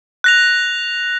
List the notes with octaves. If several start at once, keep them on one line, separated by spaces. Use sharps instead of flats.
F#6 A#6 F7